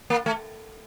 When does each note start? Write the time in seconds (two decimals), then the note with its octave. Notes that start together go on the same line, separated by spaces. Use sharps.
0.10 A#3
0.26 A3